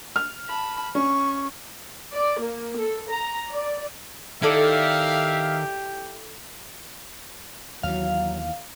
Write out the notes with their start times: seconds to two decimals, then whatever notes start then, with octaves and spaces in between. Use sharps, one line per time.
0.16 F6
0.48 A5 B5
0.95 C#4 C#6
2.11 D5
2.40 A#3
2.77 A4
3.09 A#5
3.52 D5
4.42 D#3 E4 G4 A4 D5 E5 F5
7.83 D#2 E3 F#3 F5